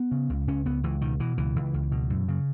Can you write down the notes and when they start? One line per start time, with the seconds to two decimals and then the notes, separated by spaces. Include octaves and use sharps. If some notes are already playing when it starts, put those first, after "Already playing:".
Already playing: B3
0.11 C#3
0.30 C#2
0.48 C#2 C#4
0.65 C#2 B3
0.84 C#2 E3
1.01 B2 D#3
1.20 B2 E3
1.38 C#2 E3
1.56 C#2
1.74 C#2
1.92 B2
2.10 F#2
2.28 C#3